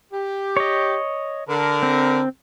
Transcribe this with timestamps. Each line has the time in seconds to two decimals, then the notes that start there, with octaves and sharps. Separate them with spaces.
0.12 G4
0.57 C#5 D#5
1.49 D3 A#4
1.83 C4